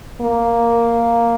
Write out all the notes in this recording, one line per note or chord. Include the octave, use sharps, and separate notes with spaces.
A#3